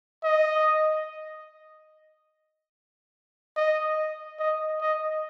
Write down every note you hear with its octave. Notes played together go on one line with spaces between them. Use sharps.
D#5
D#5
D#5
D#5